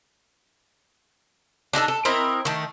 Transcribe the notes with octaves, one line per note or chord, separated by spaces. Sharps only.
D4 D#4 G#4 A4
A4
C4 E4 A#4 D#5
D#3 A3